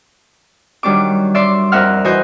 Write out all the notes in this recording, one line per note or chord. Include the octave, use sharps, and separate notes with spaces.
D#3 F#3 G3 D4 D6
D5 E5 C6 D6
F2 A#4 E5 F#5 F6
E3 F#4 C5 D#5 G#5 G6